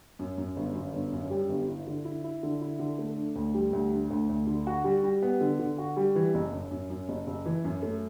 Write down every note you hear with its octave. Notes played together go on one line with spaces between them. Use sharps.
F#2
F#2
G1
F#2
G1
F#2
G3
G1
E4
D3
E4
E4
D3
E4
D3
A3
D4
D2
G3
D2
D4
D2
D2
D3
F#4
G3
G3
B3
D3
D3
F#4
G3
E3
F#1
F#2
F#2
F#2
F#1
F#1
E3
F#2
A3